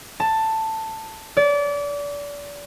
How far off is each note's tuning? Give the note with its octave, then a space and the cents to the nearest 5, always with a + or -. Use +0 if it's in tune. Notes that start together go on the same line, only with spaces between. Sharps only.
A5 +10
D5 -30